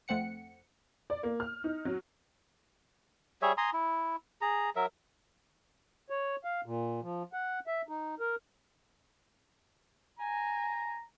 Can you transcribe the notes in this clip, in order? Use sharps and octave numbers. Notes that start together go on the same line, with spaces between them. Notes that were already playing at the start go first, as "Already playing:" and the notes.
F2 A3 C4 F#5 C#7
D5
A#3
F6
D#4
F#3
G3 G#4 C#5 E5
G#5 A#5 C6 D#6
E4
G#4 A#5
F#3 A#4 E5
C#5
F5
A#2
F3
F#5
E5
D#4
A#4
G#5 A#5